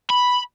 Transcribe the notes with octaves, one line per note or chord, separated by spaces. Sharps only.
B5